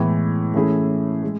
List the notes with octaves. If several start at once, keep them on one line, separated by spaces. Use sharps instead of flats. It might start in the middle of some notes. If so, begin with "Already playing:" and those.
Already playing: A2 E3 G#3 B3
E3 A3 C#4 E4 G#4
G#3